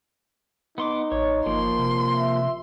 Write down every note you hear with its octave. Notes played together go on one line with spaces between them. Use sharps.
B3 D#4 C6 D6
A1 C#5
G1 F3 A#3 C6
C3
E5